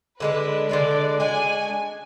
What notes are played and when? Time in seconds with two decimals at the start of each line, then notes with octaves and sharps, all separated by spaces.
0.20 D3 G#3 D4 B4
0.69 D3 G#3 D4 D5
1.20 G#3 D4 F#4 G#5